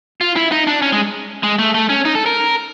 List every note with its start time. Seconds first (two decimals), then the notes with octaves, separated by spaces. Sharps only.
0.21 F4
0.36 E4
0.52 D#4
0.67 D4
0.82 C#4
0.92 G#3
1.43 G#3
1.59 A3
1.74 A3
1.89 C#4
2.05 D#4
2.15 A4
2.26 A#4